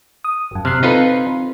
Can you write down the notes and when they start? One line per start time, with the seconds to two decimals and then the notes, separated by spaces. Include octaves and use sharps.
0.24 D#6
0.51 G1 F#2
0.65 C3 F6 F#6 C7
0.83 C4 D#4 F4 A4 B4